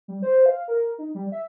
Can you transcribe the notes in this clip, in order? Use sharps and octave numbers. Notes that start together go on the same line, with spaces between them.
G3
C5
F5
A#4
D#4
G3
E5